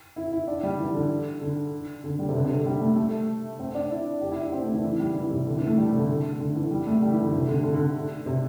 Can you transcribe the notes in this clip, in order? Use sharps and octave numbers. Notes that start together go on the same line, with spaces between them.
E4
E4
D4
G3
E3
D3
D3
D3
G3
C3
D3
C3
D3
G3
A3
A3
C4
D4
E4
G4
E4
D4
C4
A3
E3
E3
G3
E3
C3
D3
E3
A3
G3
C3
D3
D3
D3
E3
G3
A3
G3
E3
D3
C3
D3
D3
D3
D3
C3